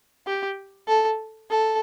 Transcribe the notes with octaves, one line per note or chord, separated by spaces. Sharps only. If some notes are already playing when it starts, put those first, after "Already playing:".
G4
A4
A4